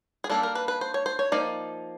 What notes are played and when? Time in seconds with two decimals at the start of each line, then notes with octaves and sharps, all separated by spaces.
0.24 G#4
0.30 G3 A#3 D4 A4
0.43 A#4
0.55 B4
0.68 B4
0.81 C5
0.94 C#5
1.06 C5
1.19 C#5
1.32 F3 A#3 D#4 D5